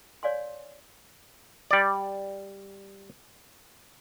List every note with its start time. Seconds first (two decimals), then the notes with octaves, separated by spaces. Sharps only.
0.23 C#5 D5 F5 G#5 C6
1.71 G3 D5